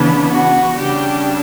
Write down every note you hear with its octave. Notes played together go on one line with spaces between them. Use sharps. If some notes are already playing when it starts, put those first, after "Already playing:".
Already playing: C#3 E3 B3 D4
F#4
C#3 G3 D4 G4